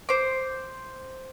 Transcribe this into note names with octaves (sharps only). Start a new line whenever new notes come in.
C5 D6